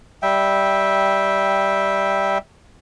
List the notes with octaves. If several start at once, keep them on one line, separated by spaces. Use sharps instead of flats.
G3 E5 G5